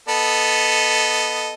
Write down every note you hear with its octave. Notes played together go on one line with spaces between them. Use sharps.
B3 A4 D#5